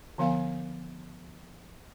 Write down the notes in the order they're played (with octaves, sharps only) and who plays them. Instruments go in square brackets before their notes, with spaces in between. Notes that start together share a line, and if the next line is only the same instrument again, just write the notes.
[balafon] D3 F3 B3 F5 G#5